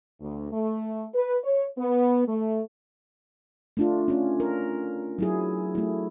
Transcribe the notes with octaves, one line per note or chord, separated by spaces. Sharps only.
D2
A3
B4
C#5
B3
A3
A3 D4 F4
C#4 F4
A#4
F#3 E4 G#4
A3 E4